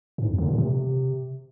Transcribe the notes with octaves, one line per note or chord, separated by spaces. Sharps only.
G#2
E2
D3
A#2
C3